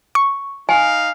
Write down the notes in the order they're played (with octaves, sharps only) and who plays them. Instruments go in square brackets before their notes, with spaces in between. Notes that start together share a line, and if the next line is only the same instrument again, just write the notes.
[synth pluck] C#6
[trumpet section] D#4 F5 [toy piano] G#5